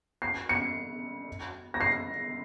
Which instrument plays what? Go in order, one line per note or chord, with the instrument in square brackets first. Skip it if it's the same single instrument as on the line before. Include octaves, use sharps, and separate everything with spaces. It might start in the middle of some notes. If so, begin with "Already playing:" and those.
[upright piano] C7
C#7
A#6
C7